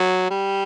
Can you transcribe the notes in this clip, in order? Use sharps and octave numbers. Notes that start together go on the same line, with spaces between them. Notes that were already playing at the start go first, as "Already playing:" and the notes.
Already playing: F#3
G3